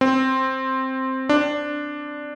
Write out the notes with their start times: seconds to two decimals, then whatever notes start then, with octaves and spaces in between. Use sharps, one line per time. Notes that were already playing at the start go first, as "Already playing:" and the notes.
0.01 C4
1.29 D4